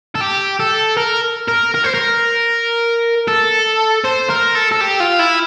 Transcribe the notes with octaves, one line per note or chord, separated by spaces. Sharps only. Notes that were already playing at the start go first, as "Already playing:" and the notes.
A4
G4
A4
A#4
A#4
A#4
C5
A#4
A4
C5
A#4
A4
A4
G4
F4
E4